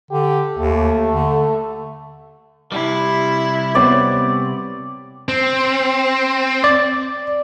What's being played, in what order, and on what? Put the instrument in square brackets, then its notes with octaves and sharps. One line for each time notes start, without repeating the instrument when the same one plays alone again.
[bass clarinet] D3 [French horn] G4
[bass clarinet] D#2 [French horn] A3
[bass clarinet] D3
[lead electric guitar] C3 G3 [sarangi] E4
[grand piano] B3 C4 C#5 [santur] D5
[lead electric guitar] C4
[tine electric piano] D5